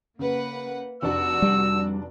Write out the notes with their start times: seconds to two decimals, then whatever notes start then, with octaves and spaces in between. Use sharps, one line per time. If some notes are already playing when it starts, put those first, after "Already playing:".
0.19 C#3 A#3 B4 F#5
1.02 F1 D4 F#4 E6
1.42 G3